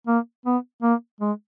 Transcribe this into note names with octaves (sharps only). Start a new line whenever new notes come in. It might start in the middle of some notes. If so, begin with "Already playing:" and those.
A#3
B3
A#3
G#3